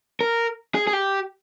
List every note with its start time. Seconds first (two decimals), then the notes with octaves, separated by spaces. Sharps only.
0.21 A#4
0.75 G#4
0.87 G#4
0.93 G4